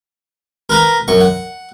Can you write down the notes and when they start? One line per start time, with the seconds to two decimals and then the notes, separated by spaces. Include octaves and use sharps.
0.69 A#4 B4 A#5
1.08 F#2 C#6
1.21 F#5